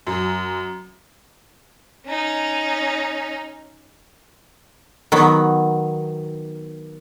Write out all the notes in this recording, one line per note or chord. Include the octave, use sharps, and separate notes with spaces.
F#2
C#4 D#4
D#3 F#3 B3